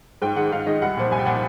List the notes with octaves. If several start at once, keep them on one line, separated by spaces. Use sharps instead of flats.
G#2 G5
D#3 G#3 F#5
G#2 F5
D#3 G#3 D#5
C2 F#5
A#2 F3
C2 G#5
G5
A#2 F3 F#5